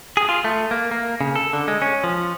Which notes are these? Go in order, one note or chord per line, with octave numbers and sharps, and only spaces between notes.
G#4
F4
A3
A#3
A#3
C#3
A4
D3
G#3
C#4
F3